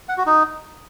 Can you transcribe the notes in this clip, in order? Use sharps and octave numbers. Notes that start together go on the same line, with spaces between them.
F#5
F#4
D#4